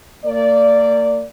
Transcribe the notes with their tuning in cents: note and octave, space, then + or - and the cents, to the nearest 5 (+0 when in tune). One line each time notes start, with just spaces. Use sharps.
A#3 -35 D5 -10